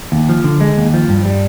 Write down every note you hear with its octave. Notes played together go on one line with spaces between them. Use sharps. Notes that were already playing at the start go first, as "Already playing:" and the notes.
D#2
F3
D3
G#3
D#2
F3
G2
G3